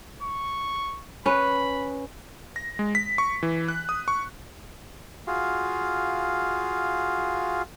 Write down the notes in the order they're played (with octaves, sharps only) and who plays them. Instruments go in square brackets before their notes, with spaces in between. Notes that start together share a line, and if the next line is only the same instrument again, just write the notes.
[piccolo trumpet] C#6
[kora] C#4 B4 [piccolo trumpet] B5
[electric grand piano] A#6
G#3
B6
C#6
E3
F#6
D#6
C#6
[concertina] F4 F#4 G#4 F5